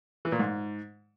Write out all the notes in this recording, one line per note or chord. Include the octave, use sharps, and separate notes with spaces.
E3
A#2
G#2